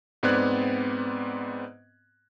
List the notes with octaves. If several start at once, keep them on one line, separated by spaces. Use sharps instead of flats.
G#2 B3 C4 D5 F#6 G#6